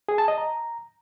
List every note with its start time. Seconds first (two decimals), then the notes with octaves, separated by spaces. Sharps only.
0.09 G#4
0.18 A5
0.28 D#5
0.38 A#5